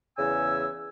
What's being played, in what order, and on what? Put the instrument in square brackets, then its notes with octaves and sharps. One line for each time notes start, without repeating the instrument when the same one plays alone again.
[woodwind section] E2 C#3 G#5 E6